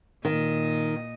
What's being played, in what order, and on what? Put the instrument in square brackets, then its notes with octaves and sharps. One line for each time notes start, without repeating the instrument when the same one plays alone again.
[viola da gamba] A#2 D#5 [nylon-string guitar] D#3